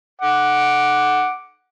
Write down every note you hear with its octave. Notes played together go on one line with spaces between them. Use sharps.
F#5 D6